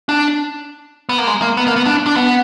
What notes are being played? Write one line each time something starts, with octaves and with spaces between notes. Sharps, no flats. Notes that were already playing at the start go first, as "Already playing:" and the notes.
D4
B3
A#3
G#3
A#3
B3
A#3
B3
D4
D4
B3